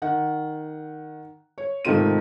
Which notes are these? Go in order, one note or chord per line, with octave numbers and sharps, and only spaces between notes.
D#3 F#5
C#5
G#2 C3 D#3 A3 F4 D#7